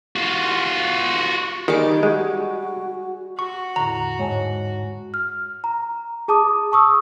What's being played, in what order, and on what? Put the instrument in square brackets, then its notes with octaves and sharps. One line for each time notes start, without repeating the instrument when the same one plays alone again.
[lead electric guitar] F4 F#4
[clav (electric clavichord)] D#3 [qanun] G3 G#4 D6 [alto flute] D#4
[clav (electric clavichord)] G#3 [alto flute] F#4
[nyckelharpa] F#4 [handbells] C#6
[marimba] E2 A2 D3 [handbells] A#5
[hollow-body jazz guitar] G#2 [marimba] C#5 G#5 A5
[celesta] F6
A#5
G#4 A5 D6 D#6
A5 C#6 D#6 E6